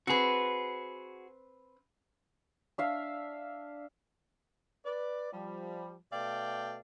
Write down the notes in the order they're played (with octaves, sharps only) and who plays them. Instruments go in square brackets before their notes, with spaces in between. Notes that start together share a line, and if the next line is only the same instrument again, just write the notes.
[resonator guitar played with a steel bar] C4 B4 [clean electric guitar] F#4 G#4
[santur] D4 E5 F5
[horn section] B4 D5
F3 G3
B2 A3 D5 F5 G5